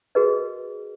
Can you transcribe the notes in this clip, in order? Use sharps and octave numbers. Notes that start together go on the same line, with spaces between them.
F#4 G#4 A#4 B4 D#5